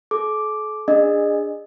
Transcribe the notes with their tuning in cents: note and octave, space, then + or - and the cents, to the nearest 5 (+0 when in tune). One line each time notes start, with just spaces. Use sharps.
A4 -45 D6 +0
D4 +0 G#4 -20 D#5 -25